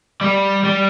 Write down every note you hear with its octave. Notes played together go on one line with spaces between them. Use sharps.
G3
G3